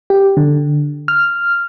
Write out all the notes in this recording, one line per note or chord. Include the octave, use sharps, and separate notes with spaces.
G4
D3
F6